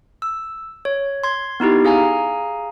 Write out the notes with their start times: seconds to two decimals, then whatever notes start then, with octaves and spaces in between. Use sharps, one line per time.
0.22 E6
0.85 C#5
1.24 C6 G#6
1.60 B3 D#4 E4 G4
1.85 G#4 F5 G#5 A#5